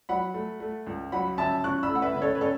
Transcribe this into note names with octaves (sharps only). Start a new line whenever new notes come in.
F#3 F#5 B5
A3
A3
C#2
F#3 F#5 B5
C#3 E5 A5
C#3 C#6 F#6
B5 E6
A3
F#5
B4 E5
C#3
A4 C#5
B4
C#3 A4 C#5